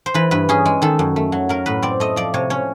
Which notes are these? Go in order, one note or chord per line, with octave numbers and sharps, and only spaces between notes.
C5
E3 B4
G2 B4
C#4 G#4
G#3
D#3 A4
F#2
A3
F#3
F#3 A#4
A2 B4
C4 D5
A3 D#5
F3 D5
C3 C#5
C#4 C#5